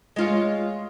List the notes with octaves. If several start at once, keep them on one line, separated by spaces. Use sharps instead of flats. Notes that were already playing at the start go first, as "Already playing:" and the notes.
G#3 F4 C#5